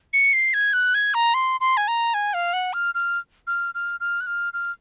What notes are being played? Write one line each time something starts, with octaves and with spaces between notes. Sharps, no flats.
C#7
C7
G#6
F#6
G#6
A#5
C6
C6
G#5
A#5
G#5
F5
F#5
F6
F6
F6
F6
F6
F#6
F6
F6